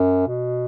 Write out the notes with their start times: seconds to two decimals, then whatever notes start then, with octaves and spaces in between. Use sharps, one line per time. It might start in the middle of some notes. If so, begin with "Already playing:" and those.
Already playing: F#2
0.27 B2